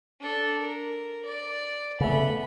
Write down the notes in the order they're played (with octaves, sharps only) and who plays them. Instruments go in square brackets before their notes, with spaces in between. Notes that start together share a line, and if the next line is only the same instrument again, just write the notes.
[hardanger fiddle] D4 A4
A#4
D5
[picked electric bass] C#3 A3 [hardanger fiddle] B3 B5